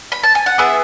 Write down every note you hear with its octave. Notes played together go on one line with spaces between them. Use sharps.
B5
A5
G#5
F#5
B3 E4 G#4 E5